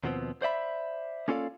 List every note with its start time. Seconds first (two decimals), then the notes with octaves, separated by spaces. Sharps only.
0.04 D#2 B2 F3 B3 C4
0.42 C5 D5 E5 B5
1.28 A#3 C#4 F4 A4 D5 F5